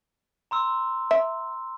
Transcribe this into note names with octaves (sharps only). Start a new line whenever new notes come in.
A#5 C6 E6
E5